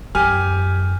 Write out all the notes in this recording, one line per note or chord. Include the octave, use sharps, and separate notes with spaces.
F#2 G4 G#5 F6